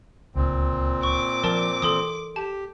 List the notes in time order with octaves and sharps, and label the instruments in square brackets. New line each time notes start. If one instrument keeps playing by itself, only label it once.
[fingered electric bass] D1 C#2 [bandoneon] A#2 C4
[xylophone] C#6 [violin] D6
[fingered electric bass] F3 [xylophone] A#4 D5 A5
[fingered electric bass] E3 [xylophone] A4 C6 D#6
[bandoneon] G4 [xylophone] A5